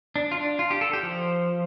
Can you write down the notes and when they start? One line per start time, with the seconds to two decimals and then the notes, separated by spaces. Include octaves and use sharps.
0.16 D4
0.31 F4
0.37 D4
0.59 F4
0.71 G4
0.81 A4
0.93 G4
1.03 F3